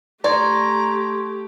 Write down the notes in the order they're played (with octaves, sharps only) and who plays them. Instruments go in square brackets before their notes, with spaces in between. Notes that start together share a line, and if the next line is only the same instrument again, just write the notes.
[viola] A3 G4 [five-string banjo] D5 [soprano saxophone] A#5 [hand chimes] C6 C#6 G#6